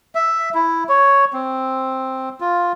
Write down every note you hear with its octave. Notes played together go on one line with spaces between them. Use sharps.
E5
E4
C#5
C4
F4